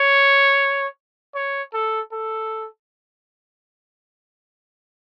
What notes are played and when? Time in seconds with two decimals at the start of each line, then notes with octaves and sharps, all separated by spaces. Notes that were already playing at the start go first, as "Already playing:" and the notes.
Already playing: C#5
1.35 C#5
1.74 A4
2.12 A4